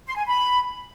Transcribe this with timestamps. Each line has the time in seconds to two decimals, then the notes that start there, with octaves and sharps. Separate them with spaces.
0.07 C6
0.17 G#5
0.26 B5